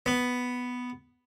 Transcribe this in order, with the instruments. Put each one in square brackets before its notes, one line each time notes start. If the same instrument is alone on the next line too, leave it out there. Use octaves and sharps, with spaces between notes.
[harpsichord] B3